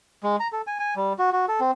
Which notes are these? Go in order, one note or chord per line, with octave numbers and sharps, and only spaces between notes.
G#3
A#5
A4
G#5
G#5
G3
F#4
F#4
A4
C4